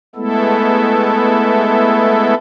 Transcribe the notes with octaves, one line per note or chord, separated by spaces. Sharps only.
G#3 A3 B3 E4 A4